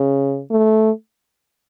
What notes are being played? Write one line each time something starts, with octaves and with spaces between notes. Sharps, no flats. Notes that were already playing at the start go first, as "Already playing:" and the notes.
Already playing: C#3
A3